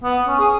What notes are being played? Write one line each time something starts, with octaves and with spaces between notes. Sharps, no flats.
B3
C#4
G#4